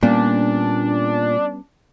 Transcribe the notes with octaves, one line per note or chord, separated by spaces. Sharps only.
A#2 G3 B3 C#4 D4